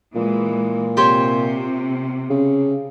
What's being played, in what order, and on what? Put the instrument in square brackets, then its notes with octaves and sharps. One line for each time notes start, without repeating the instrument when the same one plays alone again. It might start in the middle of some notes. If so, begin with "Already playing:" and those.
[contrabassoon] A#2 [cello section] E3 G#3
[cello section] C3 [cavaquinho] G4 C5 C#5
[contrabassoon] C#3